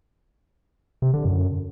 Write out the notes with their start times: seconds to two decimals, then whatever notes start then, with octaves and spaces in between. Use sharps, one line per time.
1.02 C3
1.14 D3
1.25 F#2